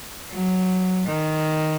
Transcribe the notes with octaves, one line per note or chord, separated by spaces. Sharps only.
F#3
D#3